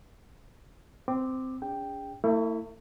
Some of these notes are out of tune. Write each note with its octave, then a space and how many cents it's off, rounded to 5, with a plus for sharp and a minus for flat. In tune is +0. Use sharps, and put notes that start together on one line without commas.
C4 -10 D6 +15
C#4 +45 G#4 -30 G5 +0
A3 +40 E4 -10